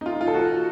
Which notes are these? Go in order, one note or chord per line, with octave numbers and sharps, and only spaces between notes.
D#4
F4
F4
A4
F#4